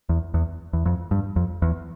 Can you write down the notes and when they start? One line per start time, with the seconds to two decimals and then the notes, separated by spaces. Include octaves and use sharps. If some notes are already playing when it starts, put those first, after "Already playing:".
0.09 E2
0.34 E2
0.73 E2
0.86 F2
1.11 G2
1.36 F2
1.62 E2